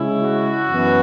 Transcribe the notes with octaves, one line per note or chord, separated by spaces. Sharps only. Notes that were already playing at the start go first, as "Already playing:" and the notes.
Already playing: C#3 G#3 C#4 E4
F#4
F#2 E3 B3